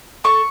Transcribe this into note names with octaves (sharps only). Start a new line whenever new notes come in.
A4 C#6